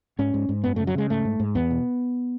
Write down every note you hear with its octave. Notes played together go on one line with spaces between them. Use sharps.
G#2 C#4
G#2
G#2
F#2 B3
A3
C#3
F#3
C#3 G#3
G#2 A3
G#2
G#2
E2 B3
B2